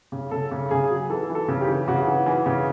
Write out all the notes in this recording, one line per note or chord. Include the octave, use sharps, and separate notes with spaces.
C#3
C#3 A4
C#3
C#3 G#4
F#3
E3 A4
E3
A4
C#3
G4
E3
C#3 F#4
E3
E3
C#3